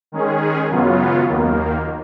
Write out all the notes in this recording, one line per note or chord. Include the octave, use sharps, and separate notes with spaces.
D#3 G#3 C#4 G#4
F#2 C#3 F#3 B3 F4
D#2 D#3 A#3